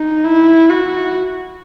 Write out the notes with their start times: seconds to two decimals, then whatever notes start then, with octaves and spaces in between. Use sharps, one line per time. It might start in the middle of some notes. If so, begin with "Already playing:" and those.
Already playing: D#4
0.24 E4
0.70 F#4